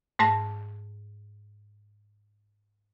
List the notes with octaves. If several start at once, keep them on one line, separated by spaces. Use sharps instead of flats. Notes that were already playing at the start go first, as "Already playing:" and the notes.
G#2 A3 A5 A#6